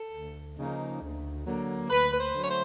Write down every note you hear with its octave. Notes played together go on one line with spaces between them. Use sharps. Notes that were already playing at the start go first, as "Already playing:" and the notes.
Already playing: A4
D2
C#3 F3 A#3 D#4
D2
D3 F#3 A#3
D2 B4
B4
C5
D3 F#3 A3
C#5
C5